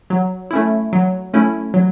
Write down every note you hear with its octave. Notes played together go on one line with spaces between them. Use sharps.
F#3
A3 C#4 E4
F#3
A3 C#4 E4
F#3